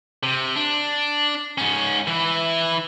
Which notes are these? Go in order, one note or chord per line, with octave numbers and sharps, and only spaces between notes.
C3
D4
G#2 C#4
E3 E4